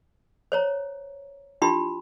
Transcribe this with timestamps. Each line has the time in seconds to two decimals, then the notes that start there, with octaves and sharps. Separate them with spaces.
0.52 C5 C#5 A#5
1.62 D4 E4 F4 G4 B5 C6